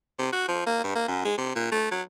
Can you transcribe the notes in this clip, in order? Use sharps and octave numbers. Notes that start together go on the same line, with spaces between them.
C3
F#4
F3
A#3
G2
A#3
F#2
G#3
C3
A#2
A3
F#3